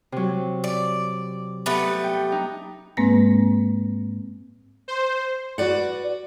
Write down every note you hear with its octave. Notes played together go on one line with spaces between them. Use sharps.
C3 F#3
D5
G3 A3 B3 B5
G5
D#4
G#2 G#3 A#3 C4 B4 A#6
C5
F#4 B4 D5 F#5